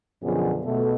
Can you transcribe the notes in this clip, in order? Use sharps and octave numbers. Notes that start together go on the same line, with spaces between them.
F#2 B2 D3 F3 G#4
B2 A3